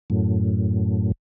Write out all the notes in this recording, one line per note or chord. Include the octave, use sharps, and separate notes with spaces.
F#2 A2